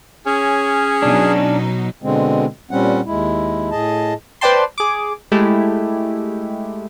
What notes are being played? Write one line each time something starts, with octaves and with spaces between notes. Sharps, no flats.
C#4 G#4
B2 F#3 D4 D#4
B2 D3 G#3 C4
A#2 G3 C4 C#4 F#5
D#2 G#3 E4
A2 G#4 D#5 A5
B4 C5 D5 G5 A5 C6
G#4 D6
G#3 A3 E4 G4